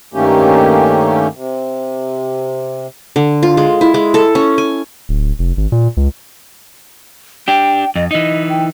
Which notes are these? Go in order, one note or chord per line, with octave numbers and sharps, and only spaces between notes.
G2 D#3 A3 A#3 C#4 G4
C3
D3
F4
G#3
E4
G#3
A4
C#4
G#5
D1
F1
G#1
A#2
C#2
D4 G4 G5
F2 D#5
E3 D#4 D#5
G5